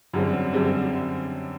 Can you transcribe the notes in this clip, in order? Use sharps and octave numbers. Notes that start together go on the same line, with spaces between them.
F#2 D3 G3 C4
F#2 D3 G3 C4